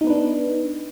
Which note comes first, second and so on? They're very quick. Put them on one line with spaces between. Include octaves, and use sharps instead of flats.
D#4 B3 B4 D4